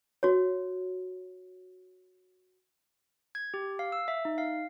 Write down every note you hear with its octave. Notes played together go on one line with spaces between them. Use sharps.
F#4 C#5
G#6
G4
F5
E6
E5
D#4
F5